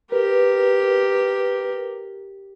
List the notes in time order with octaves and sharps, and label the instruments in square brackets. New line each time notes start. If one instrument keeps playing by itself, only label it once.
[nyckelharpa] G4 A#4 [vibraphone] B4